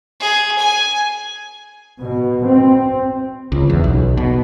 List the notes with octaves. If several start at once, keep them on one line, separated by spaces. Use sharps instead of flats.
G#4
G#5
B2
C4
C#2
E2
B1
B2